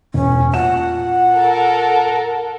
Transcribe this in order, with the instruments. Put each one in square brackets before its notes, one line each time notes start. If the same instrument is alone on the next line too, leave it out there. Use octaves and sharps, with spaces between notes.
[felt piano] E1 [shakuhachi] C#4
[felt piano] A#2 A5 E7 [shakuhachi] F#5
[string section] A4 A#4